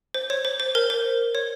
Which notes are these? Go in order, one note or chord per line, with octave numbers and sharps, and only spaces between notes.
C5
C#5
C5
C5
A#4
C5
C#5